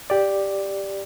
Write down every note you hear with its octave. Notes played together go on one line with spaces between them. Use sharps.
G4 D5